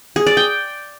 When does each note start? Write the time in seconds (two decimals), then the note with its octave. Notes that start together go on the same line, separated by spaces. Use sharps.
0.16 G#4
0.26 D5
0.37 G5